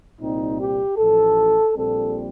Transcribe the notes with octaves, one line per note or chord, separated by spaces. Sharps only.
C2 A#2 G3 C4 D#4
G4
A1 A2 F3 A4
A#1 A#2 G3 C4 A4